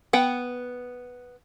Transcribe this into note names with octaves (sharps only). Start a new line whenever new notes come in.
B3 F#5 G5